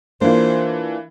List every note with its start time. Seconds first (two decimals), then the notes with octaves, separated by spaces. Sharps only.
0.21 E3 A#3 D4 F4 C5